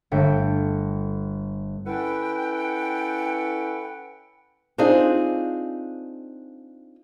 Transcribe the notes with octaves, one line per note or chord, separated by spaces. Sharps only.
G1 A3 G5 B6 C#7
C#4 E4 A4 B4 F#5 G5
C4 D4 D#4 F4 G#4